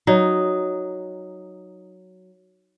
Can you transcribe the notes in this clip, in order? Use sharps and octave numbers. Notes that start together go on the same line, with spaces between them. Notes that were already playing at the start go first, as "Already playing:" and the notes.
F#3 D#4